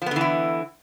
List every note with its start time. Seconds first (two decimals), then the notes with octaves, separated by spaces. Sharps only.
0.02 F3
0.06 B3
0.11 D3
0.16 E3
0.21 E4